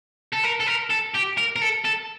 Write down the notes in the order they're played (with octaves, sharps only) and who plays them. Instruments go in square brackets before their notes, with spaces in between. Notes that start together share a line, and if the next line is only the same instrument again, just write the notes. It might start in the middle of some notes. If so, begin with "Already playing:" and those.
[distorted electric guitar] A4
A#4
A4
A#4
A4
G4
A#4
A#4
A4
A4